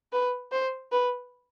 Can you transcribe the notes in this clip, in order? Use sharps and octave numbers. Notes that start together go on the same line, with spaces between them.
B4
C5
B4